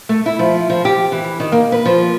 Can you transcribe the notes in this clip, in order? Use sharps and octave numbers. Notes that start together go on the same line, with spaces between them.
A3
E4
F3
F3
G4
E3
D#3
A#3
B4
F3